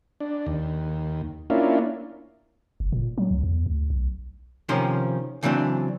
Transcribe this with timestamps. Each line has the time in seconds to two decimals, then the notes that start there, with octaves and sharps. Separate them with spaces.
0.20 D4
0.46 D#2
1.50 A#3 C#4 D4 E4 F4
2.80 F#1
2.92 A#2
3.18 F#3
3.31 C#2
3.43 E2
3.66 D2
3.90 B1
4.69 C3 D#3 F3 C#4 C5
5.43 C#3 E3 F#3 C4 D4